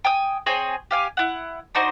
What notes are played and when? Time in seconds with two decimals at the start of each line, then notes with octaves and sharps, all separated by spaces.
0.04 G5 G#5 D#6
0.46 C4 G#4 C#5 G#5
0.91 G4 F5 G#5
1.17 E4 F#5
1.75 D4 D#4 F#4 C5